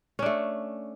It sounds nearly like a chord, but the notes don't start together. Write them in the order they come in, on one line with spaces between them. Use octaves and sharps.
C#4 D4 A3